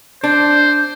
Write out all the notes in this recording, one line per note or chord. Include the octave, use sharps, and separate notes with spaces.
D4 C5